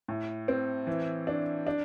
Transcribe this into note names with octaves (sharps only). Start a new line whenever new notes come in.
A2
C4
E3
D4
D4